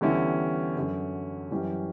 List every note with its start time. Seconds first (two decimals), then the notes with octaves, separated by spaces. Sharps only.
0.01 E2 D3 G3 C#4 E4
0.76 F#2 D3 F#3 C#4
1.51 F#2 E3 G3 C#4